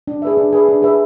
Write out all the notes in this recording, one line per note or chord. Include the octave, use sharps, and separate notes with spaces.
D4
G#4 B4 E5
D4
G#4 B4 E5
D4
G#4 B4 E5